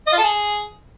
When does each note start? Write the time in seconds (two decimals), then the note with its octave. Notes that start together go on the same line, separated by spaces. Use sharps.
0.07 D#5
0.13 F4
0.18 A4
0.24 G#4